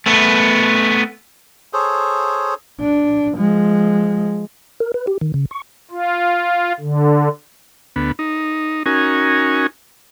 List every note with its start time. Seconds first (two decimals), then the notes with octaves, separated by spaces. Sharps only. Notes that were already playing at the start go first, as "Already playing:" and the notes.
0.06 A3 B3
1.73 G#4 A4 C5 C#5
2.80 D4
3.35 F3 G#3
4.80 A#4
4.94 B4
5.07 G4
5.21 D#3
5.34 C#3
5.51 C#6
5.91 F4
6.80 D3
7.96 D2 B3
8.19 D#4
8.86 C#4 D#4 F#4 A#4 G#5